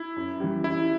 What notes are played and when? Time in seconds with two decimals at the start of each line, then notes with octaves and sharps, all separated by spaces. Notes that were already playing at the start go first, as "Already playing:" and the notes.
Already playing: E4
0.16 F#2
0.40 E3 G3
0.64 F#2 E4